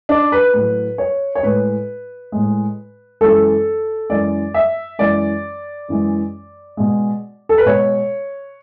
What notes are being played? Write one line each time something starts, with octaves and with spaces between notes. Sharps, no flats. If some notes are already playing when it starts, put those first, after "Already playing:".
D4
B4
A2 F#3 B4
C#5
C#5
A2 G#3 B4
A2 G#3
F#2 E3 G#3 A4
F#2 E3 G#3 D5
E5
F#2 E3 G#3 D5
F#2 E3 G#3
B2 G#3
A4
B4
B2 G#3 C#5